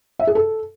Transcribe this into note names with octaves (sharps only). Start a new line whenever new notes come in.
E5
G#4
A4